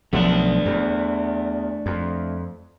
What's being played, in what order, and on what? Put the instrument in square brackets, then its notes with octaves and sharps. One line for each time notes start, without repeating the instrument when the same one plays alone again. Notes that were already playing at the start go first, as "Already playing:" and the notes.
[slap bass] B1 F3 B3 [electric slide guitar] A3 D4
[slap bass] E2
F2